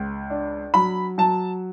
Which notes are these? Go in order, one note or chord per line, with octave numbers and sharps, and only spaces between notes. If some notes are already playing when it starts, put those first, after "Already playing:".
Already playing: C#2
D4
F#3 B5
F#3 A5